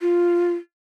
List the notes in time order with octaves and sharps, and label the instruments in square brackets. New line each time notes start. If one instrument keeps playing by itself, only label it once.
[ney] F4